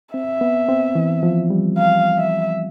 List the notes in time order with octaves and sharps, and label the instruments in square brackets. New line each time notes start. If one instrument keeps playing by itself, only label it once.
[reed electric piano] C4 [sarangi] E5
[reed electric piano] B3
C4
E3
F3
G3
[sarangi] F5
E5